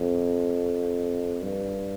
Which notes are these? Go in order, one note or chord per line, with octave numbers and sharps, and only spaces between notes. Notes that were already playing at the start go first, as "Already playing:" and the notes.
Already playing: F2
G2